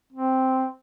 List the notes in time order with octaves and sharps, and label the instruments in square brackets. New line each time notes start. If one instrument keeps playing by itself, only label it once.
[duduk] C4